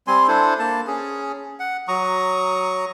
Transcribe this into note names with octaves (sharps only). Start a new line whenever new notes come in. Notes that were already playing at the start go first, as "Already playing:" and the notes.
G3 C4 G#5 C6
D4 E4 A4 C5
A#3 A5
C#4 G#4
F#5
F#3 A#5 C#6 D#6